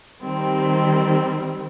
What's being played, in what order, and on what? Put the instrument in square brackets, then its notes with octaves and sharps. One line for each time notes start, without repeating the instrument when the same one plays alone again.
[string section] D#3 G3 C4